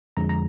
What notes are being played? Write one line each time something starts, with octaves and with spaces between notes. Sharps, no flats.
F2 D3 F3 G#3 A#5
A#5